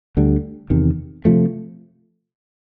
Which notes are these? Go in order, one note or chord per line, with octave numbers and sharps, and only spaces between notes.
D2 D3 G3
E2 C3 D#3
C3 F3 A3